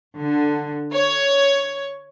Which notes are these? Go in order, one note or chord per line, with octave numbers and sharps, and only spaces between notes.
D3
C#5